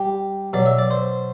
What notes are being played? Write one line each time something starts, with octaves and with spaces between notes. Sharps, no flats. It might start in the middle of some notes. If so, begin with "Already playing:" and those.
Already playing: G3 G4
B2 F#3 D5
E5
D5
C5